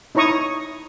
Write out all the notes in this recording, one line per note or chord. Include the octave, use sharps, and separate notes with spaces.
D#4 E4 C#5 A#5 C#6 D#6